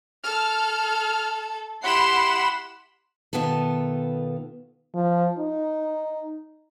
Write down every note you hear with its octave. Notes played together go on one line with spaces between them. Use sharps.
A4 F6
E4 G4 F#5 B5 C6 E7
B2 D#3 B3 F4 A4
F3
D#4